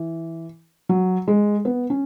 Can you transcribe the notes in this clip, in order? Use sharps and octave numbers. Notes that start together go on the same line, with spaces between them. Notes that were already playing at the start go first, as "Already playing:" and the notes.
Already playing: E3
F#3
G#3
B3
C#4